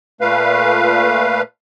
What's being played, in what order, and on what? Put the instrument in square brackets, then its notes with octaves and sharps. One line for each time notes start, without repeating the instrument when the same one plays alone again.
[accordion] A#2 A3 B4 F5